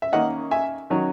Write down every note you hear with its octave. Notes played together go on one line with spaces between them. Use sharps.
E5
D#3 A#3 C#4 D#5 F#5
E5 G#5
D#3 F#3 C#4